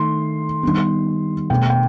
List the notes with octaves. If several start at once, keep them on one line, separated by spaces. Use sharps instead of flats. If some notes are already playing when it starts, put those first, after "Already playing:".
Already playing: D#3 A3 C6
D#3 G3 B3
B2 A3 G5
G5